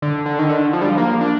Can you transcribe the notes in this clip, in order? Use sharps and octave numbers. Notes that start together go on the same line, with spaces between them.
D3
D3
D#3
D3
F3
G3
F3
A#3
D4